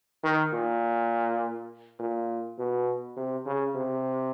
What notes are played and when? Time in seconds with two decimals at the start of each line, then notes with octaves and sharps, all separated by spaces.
0.24 D#3
0.53 A#2
1.99 A#2
2.58 B2
3.17 C3
3.46 C#3
3.75 C3